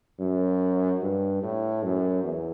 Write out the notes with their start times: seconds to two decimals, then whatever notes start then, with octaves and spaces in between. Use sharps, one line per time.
0.20 F#2
1.01 G2
1.43 A2
1.83 F#2
2.23 E2